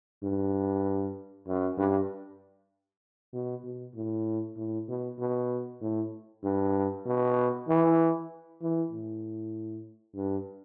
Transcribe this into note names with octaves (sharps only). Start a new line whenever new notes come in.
G2
F#2
G2
B2
B2
A2
A2
B2
B2
A2
G2
B2
E3
E3
A2
G2